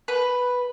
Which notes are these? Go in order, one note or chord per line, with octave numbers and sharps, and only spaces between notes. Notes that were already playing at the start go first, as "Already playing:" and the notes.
B4